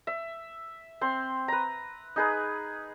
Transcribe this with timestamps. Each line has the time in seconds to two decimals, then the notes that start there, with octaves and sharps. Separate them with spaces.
0.07 E5
1.01 C4 C6
1.48 B4 A#5
2.16 D#4 G#4 B4